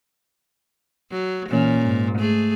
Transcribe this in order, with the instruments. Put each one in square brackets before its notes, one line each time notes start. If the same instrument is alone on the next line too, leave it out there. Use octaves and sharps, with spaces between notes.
[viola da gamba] F#3
[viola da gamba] A#2 [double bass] E3 C#4
[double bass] G#2
[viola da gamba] A3 G#4